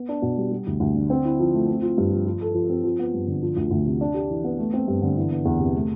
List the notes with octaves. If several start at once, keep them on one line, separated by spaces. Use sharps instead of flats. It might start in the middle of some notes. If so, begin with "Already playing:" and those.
Already playing: B3
D4
B2
G3
G3
D2
D2
D3
C4
E4
F3
A3
C4
F4
G2
F3
F4
A4
F3
C4
F3
B3
G2
D3
F3
D2
D2
C3
D4
G4
E3
B3
A3
C4
G2
D3
E3
B3
E2
C3
A3